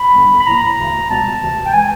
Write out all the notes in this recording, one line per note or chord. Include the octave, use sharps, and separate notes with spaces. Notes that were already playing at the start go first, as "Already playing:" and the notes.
Already playing: B5
G2 D3 G3 B3
B5
A2 F3 A#3 A#5
D2 C#3 E3 A3
C#2 B2 G3 B3 A5
D2 C3 E3
G5
E3 G#3 G#5